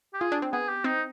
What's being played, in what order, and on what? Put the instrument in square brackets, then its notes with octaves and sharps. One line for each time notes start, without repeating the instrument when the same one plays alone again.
[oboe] G4
[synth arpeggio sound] F4 [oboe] G#4
[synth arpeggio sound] D4
C4
[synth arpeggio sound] B3 [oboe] G#4
[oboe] G4
[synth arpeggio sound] C4 [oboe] D#4